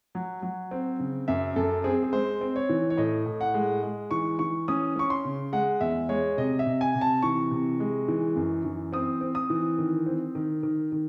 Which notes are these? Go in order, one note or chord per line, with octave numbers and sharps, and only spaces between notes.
F#3
F#3
C4
C#3
F#2 E5
F#2 A4
C4 G#4
G#4
G#3 C5
C4
C#5
E3
C#5
A2 D#5
A2
F#5
G#3
G#3
E3 C#6
E3 C#6
C#4 D#6
C#4 C#6
C6
C#3
G#3 F#5
E2 E5
G#3 C#5
C3 D#5
E5
C3
G#5
C3
A5
E3 C#6
C3
G#3
E3
F#2
E3
C4 D#6
C4
D#6
E3
D#3
C4
D#3
D#3
D#3